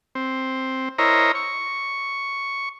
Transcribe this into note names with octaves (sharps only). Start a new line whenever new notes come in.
C4
E4 A#4 C5 C#5 D#5 A#5
C#6